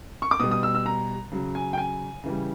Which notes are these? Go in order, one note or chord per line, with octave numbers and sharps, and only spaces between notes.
C#6
D6
B2 G3 D#6
D#6
E6
E6
A#5
C#3 F#3
G#5
G5
G#5
C#3 E3 G3